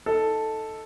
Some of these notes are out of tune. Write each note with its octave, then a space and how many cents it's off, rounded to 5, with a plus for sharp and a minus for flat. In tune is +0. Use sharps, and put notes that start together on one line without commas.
D#4 +15 A4 +0